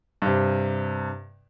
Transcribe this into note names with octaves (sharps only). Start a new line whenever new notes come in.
G2 C3